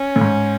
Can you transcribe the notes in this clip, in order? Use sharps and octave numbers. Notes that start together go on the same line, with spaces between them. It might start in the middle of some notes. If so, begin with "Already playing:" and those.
Already playing: C#4
A2
G#2